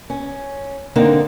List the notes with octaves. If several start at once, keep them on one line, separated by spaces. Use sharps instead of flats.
C#4
D3 A#3 C4 D4 D#4